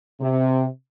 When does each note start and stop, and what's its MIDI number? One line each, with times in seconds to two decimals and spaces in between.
0.21 0.66 48